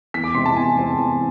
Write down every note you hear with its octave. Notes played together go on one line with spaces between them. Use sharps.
E2 B6
D6
C3 G#3 C4 C6
A5
E2 G#5
C3 G#3 C4
E2